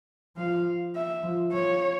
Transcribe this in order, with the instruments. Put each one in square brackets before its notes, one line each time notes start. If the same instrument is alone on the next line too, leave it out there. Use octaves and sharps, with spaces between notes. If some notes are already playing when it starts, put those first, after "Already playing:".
[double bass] F3 [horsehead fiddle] F5
[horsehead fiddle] E5
[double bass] F3
[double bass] F3 [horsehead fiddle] C#5